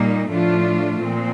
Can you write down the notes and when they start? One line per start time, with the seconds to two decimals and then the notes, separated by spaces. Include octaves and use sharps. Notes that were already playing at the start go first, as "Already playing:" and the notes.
Already playing: A#2 G3 A#3 D#4
0.30 A2 F3 A3 D4 F4
1.00 A#2 F3 C4